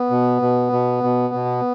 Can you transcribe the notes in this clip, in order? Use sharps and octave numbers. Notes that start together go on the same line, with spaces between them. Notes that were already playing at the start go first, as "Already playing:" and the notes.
Already playing: B3
B2
B2
B2
B2
B2